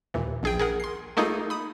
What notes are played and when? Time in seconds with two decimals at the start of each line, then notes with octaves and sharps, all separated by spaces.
0.14 D#2 A#2 E3
0.43 A#1 G#4 G5
0.59 G#4 A#4 F#5
0.80 C6 C7
1.17 A3 A#3 D#4 F4 G#4 A4
1.50 B5 D#6